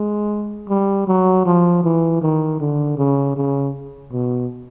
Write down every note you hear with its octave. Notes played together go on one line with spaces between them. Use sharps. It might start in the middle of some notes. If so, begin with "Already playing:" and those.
Already playing: G#3
G3
F#3
F3
E3
D#3
D3
C#3
C#3
B2